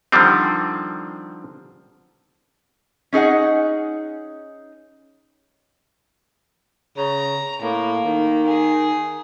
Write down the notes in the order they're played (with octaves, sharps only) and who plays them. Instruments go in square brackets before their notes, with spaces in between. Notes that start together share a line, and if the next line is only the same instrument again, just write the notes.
[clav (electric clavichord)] D3 D#3 F3 G3 C4
[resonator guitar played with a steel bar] C#4 D#4 G#4 D#5 F#5
[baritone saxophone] C#3 [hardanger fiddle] A#5
[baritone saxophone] A2 [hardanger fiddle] A#3
[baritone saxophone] D#3
[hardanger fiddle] G#4